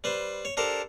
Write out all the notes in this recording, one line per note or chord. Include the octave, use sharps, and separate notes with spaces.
G3 B4 C5
C#5
D4 G4 A4 A#4 C5